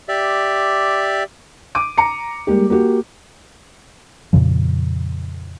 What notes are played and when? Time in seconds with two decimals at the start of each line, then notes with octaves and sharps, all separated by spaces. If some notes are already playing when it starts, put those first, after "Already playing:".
0.08 G4 D5 E5
1.75 D6 D7 D#7
1.98 A#5 C#7
2.47 G3 G#3 A#3 G4
2.70 A#3 F#4 G4
4.33 F2 A#2 C#3 F3